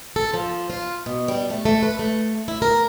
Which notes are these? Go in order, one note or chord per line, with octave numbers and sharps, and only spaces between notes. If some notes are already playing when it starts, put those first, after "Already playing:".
A4
F3
F4
B2
G3
A3
A3
B4
A3
E4
A#4